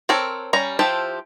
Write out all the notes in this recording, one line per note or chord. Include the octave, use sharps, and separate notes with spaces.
C4 A4 A#4 C#5
G3 C#4 A#5
F3 E4 G4 C5 A5